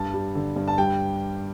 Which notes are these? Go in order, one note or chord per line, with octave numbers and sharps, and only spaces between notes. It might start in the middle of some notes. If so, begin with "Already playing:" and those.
Already playing: G2 A5
G3
D3
G2
A5
G3 G5